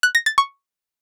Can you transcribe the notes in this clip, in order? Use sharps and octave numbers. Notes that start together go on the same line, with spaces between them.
F#6
A#6
A6
C#6